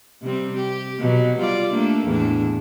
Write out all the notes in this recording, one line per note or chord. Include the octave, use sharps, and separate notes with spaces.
C3 G3 C4
G4
B2 F#3
G3 F4 D5
A3 A#3 D4
E2 A2 D4